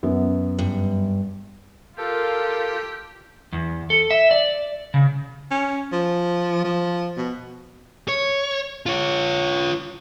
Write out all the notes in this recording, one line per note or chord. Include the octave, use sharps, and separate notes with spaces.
F#2 B3
G2
F4 G4 A4 A#4
E2
A4
E5
D5
C#3
C#4
F3
F3
B2
C#5
F4 C#5